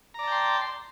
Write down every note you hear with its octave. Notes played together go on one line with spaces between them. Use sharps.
D5 G5 A5 A#5 C6